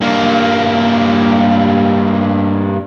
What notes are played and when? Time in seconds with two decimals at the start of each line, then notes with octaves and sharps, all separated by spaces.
0.01 G2 A#3